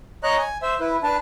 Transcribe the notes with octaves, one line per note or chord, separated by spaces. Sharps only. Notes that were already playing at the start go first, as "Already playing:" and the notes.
C#5 D#5 A#5 F#6
G#5
C5 E5
E4 B4
D4 B4 A5